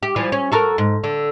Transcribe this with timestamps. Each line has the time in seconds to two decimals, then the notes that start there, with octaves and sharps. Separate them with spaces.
0.03 G4
0.16 E3 F3 G3
0.32 C#4
0.52 F#4 A4 A#4
0.78 G#2
1.04 D3